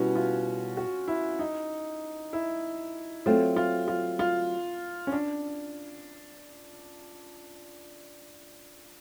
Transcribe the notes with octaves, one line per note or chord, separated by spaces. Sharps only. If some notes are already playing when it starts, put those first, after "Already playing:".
Already playing: B2 G3 B3 C#4 E4 F#4
F4
F#4
E4
D#4
E4
F#3 A3 C4 F4
F4
F4
F4
C#4
D4